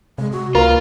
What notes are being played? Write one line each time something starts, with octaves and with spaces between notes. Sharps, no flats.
C3 G#3
F#4
C#2 A#3 F4 A#4